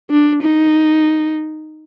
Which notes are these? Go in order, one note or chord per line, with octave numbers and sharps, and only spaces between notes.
D4
D#4